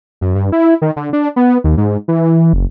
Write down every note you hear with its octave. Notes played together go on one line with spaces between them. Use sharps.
F#2
G2
E4
D#3
D3
D4
B3
D#2
G#2
E3
F#1